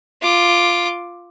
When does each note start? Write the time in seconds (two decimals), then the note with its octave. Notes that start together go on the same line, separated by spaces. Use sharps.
0.22 F4 D6